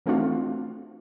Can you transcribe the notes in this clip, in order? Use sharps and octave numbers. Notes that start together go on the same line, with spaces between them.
E3 A3 C4 D4 F4 F#4